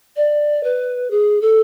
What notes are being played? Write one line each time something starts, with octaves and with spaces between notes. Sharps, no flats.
D5
B4
G#4
A4